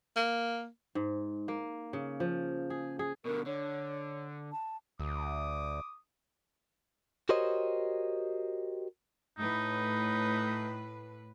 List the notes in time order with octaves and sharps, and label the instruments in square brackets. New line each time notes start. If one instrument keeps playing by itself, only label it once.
[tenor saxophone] A#3
[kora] G#2
A#3
C#3
F3
G#4
G#4
[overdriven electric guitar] B2 D3 [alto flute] A#4
[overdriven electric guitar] D3 [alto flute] C#5
[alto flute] A5
[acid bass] D2 [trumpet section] D6 D#6
[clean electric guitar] F#4 G4 A#4 C5 C#5 D#5
[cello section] A2 B4 [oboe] D#4